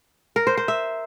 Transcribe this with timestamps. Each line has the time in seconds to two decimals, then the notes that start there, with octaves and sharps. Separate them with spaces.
0.36 A#4
0.47 C5
0.57 C5
0.68 E5